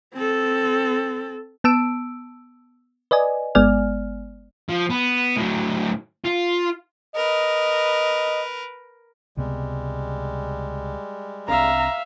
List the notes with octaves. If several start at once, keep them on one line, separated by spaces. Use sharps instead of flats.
C4 A4
B3 A5 E6 D7
B4 D5 D#5 G#5
G1 G#3 B3 D5 G#5 F6
F3
B3
A2 F#3
F4
A#4 B4 D#5
C#2 C3 G3 G#3 B3
C2 C4 D4 E5 F5 A#5